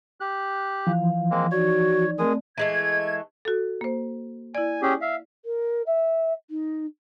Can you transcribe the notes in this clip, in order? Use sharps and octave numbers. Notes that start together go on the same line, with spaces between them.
G4 F#6
E3 F3 F5
G#3 A#3 C4
D#4 F#4 C#5 D5
G#3 A3 C4 G#4 A#4 D5 D#6
E3 G#3 A3 G#6
F#4 A4
A#3 C5
E4 D5 G#5
C#4 G4 G#4
E5 F5
A#4
E5
D#4